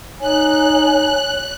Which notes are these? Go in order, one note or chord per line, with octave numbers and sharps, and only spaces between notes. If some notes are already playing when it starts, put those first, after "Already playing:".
D#4 C#5 G#5 F#6